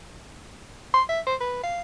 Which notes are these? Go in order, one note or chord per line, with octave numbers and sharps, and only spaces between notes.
C6
E5
C5
B4
F5